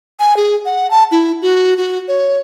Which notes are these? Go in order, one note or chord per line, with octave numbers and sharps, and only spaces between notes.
G#5
G#4
F#5
A5
E4
F#4
F#4
C#5